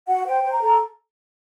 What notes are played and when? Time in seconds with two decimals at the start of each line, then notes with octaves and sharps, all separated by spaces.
0.09 F#4 F#5
0.26 C5 G5
0.43 C5
0.52 A#5
0.61 A4